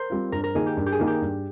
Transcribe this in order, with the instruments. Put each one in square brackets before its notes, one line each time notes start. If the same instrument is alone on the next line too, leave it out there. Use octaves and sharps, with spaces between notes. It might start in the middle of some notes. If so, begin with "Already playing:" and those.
Already playing: [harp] A#4 C5
[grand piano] G3 C4 F4
[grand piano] G2 [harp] A#4
[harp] A#4
[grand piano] D#3 A#3 D#4 [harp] G#4
[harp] G4
[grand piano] G2
[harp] G4
G#4
[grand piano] D#3 A#3 D#4
[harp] G4
[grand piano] G2